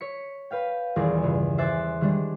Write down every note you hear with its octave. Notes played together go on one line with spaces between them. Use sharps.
C#5 B6 C#7
B4 F5 G5
D#1 E2 G#4 D5 A#6
C#2 G2
C5 E5 G#5 D6 F#6 A6
D#3 G3 G#3 D4